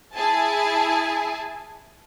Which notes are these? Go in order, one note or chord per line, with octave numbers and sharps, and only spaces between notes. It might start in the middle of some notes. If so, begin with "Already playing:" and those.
E4 G#4 G#5 A5